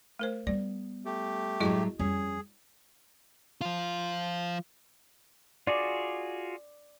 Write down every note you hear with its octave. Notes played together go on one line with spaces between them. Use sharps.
A3 A#4 C5
G3 B3 D5
A3 G4
A2 F#3 G#3 E4 F#4 D#5
F2 G3 C#4 G#4
F3 F4
F4 F#4 G#4 D5